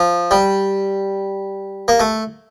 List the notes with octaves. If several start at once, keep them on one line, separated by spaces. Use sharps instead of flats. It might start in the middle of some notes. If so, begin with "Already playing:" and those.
Already playing: F3
G3
A#3
A3